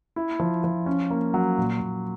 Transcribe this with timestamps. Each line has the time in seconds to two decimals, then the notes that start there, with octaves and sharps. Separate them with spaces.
0.16 E4
0.39 F3
0.64 F3
0.86 C#4
1.10 A#3
1.34 F#3
1.58 A#2
1.81 A#2